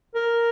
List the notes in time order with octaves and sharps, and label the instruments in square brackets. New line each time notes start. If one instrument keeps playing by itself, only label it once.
[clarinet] A#4